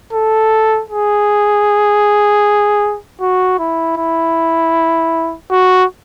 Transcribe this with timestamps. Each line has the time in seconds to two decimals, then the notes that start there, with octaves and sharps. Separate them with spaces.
0.13 A4
0.90 G#4
3.21 F#4
3.59 E4
3.97 E4
5.51 F#4